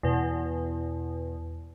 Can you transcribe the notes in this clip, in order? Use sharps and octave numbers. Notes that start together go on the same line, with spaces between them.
E2 B2